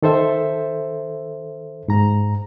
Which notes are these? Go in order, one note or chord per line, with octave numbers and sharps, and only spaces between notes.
D#3 A4 C5 E5
G#2 A#5